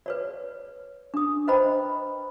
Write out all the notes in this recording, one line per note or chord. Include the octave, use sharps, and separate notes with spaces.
B4 C#5 D5
D4 D#6
B4 C5 D#5 G5 A#5 B5